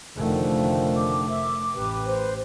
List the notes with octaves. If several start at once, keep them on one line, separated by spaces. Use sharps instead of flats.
F1 D3 D#3 F3 A3
D6
E5
A1 G4 B4
C5